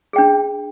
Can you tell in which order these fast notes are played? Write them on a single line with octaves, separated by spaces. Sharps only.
G#4 G5 D4